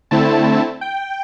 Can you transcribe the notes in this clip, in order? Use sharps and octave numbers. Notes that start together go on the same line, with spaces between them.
D3 A3 C4 E4 A5
G5